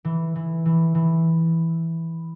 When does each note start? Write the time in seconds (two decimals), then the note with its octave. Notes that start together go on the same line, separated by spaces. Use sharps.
0.05 E3
0.36 E3
0.66 E3
0.95 E3